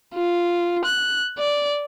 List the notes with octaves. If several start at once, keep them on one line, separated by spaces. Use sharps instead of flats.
F4
F#6
D5